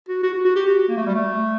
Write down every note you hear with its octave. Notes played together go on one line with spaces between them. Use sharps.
F#4
F#4
F#4
F#4
G4
F#4
A#3
A3
G3
A3